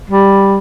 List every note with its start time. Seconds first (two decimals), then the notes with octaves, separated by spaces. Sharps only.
0.10 G3